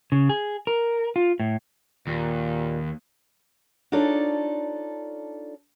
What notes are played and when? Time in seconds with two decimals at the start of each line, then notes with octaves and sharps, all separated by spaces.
0.12 C#3
0.29 G#4
0.67 A#4
1.16 F4
1.40 A2
2.07 D#2 A#2
3.92 D4 D#4 F4 A4 C#5 D5